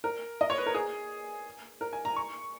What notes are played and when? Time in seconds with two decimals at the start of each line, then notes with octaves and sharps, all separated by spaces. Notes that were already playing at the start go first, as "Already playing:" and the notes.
0.04 A#4
0.41 D#5
0.50 C#5
0.58 B4
0.66 A#4
0.75 G#4
1.81 A#4
1.93 G#5
2.05 A#5
2.16 C#6